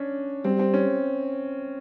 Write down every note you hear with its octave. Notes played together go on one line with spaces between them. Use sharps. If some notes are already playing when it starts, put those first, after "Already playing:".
Already playing: C#4 D4
G3 C4
C4
C#4